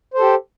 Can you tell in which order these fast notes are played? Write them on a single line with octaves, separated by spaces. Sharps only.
C5 A4 G4